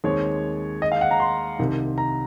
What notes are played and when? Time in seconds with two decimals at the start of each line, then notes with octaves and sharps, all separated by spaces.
0.04 D#2 D#3 G#3 C4 C#5
0.82 D#5
0.92 F5
1.01 F#5
1.11 A#5
1.20 C6
1.59 C2 C3 D#3
1.98 A#5